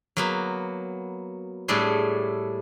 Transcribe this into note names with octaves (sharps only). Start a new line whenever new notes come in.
F#3 A#3 B3
A2 G3 A3 D4 G#4